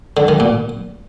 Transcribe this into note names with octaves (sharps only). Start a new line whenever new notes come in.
D3
D#3
A#2